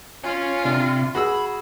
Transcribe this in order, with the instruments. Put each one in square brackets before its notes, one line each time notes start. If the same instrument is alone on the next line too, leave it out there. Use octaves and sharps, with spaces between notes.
[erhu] F4 [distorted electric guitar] C#5 G#5
[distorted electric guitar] C3 [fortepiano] D4
[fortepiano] F#4 G#4 E6 [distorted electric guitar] B5